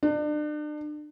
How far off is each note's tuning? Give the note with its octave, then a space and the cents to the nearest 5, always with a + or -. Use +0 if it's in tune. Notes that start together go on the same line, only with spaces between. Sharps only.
D4 +35